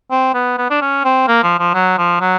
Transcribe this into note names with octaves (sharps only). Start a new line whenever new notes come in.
C4
B3
B3
D4
C#4
C4
A#3
F3
F3
F#3
F3
F#3